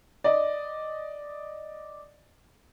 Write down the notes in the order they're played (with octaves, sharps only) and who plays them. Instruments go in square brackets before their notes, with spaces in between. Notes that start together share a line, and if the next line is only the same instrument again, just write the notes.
[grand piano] D5 D#5